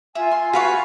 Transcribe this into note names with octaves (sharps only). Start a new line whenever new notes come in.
F4 E5 G#5
C6
F#4 B4 F5 C#6